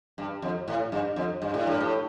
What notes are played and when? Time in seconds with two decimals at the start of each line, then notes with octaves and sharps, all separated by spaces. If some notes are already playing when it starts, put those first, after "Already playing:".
0.18 G2
0.42 F2
0.68 A2
0.92 G2
1.16 F2
1.42 G2
1.54 A2
1.67 G2
1.80 A2